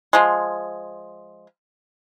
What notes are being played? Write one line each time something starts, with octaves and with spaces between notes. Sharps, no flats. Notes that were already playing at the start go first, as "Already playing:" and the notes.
F3 G#3